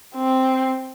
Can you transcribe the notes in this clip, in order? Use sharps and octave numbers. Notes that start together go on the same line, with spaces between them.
C4